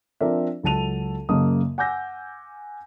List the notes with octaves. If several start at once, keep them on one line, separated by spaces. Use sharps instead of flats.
F3 C4 D4 A#4 D5 E5
C#2 F#3 A4 A5 D#7 F7
F#2 C#3 A#3 D#5 A5 D#6
F#5 G#5 D6 E6 G6 A#6